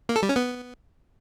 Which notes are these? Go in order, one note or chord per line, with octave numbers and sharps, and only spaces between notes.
A#3
A4
G3
C#4
B3